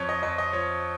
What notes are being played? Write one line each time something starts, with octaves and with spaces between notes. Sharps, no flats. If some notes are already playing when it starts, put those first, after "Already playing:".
Already playing: F2 C#5
D#5
F2 D#5
D#5
F3 C#5